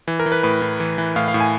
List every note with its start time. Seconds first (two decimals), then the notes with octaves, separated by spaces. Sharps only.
0.08 E3
0.19 A#4
0.26 E3
0.32 B4
0.43 A2 B4
0.62 A2
0.80 E3
0.98 E3
1.16 A2 F5
1.28 F5
1.34 A2
1.40 G#5